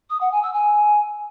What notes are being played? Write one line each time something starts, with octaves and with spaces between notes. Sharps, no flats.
D#6
F#5
G#5
E6
G#5